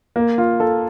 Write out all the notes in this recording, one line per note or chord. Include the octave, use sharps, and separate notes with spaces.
A#3
F4
A4